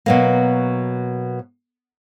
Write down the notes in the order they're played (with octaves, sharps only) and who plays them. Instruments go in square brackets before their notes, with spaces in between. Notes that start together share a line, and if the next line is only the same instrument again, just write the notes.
[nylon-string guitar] B2 F#3 A#3